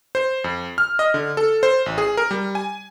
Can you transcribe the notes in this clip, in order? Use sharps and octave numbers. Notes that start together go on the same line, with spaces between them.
C5
F2
F6
D#5
D3
A4
C5
A1
G#4
A#4
G3
G#5